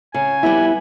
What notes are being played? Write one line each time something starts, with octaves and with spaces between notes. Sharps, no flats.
C#3 G#5
G3 B3 E4